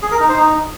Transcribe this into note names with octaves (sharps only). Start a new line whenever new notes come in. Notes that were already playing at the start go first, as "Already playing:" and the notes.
G#4
A#4
D#4
C5
D#4